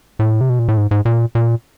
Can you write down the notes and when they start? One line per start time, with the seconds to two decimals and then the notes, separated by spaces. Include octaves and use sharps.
0.19 A2
0.41 C3
0.49 B2
0.59 A#2
0.68 A2
0.77 G#2
0.91 G#2
1.05 A#2
1.35 A#2